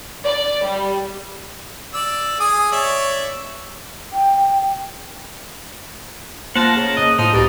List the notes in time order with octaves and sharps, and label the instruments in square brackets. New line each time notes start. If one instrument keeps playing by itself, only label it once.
[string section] D5
G3
[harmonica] D5 E6
G#4 G#5 D#6
C#5 D5 E5
[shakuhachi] G5
[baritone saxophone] F3 [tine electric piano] A#3 F#6 A#6 [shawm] A#4 [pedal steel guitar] F#5 A5
[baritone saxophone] C#3
[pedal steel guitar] D#5
[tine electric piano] A2 [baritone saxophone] F3 [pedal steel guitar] D#4 [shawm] D#6
[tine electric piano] C2 G4 [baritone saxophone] B2 [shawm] D5